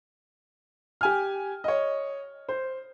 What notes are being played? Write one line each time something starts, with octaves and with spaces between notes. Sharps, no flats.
G4 G#5 F6
C#5 D#5
C5